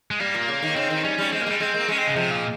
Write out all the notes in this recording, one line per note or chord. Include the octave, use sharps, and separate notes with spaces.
G#3
G3 A#3
A#2
C#3
D#3
C#3 C4
D#3
G3 C#4
G3
G#3 C4
A#3
G3 G#3
G#3 C4
A#3
G#3 C#4
C4
C#3
C3 F3
A#2